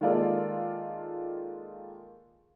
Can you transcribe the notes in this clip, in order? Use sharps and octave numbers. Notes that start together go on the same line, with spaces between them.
D#3 G#3 A#3 F4 A4 D5